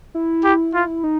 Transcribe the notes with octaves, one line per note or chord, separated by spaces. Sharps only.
E4
G4
F4
D#4